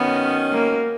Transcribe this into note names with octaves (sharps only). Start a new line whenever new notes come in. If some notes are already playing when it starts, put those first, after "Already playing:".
Already playing: D#3 F#3 B3 C#4
A#3